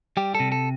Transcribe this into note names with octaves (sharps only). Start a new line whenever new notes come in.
G3 G4
A4
C3
A4